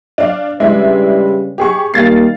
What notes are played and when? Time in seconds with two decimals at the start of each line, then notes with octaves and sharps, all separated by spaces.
0.18 D4 D5 F5
0.60 C#3 G3 G#3 D4 E4 B4
1.58 G4 G#4 C#6
1.94 D#3 G3 A#3 F5 A6 C7